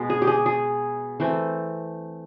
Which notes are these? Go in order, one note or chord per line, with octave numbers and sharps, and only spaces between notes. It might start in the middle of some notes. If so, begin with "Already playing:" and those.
Already playing: B2 G#3 B3
G#4
G4
G#4
G#4
E3 A3 C4